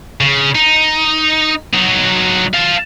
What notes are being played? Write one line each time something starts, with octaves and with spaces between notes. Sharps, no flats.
C#3
D#4
F#3 D#4
F5 A5